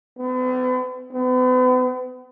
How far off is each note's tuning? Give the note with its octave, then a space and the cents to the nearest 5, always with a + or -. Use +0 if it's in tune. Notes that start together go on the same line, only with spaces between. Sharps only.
B3 +45
B3 +40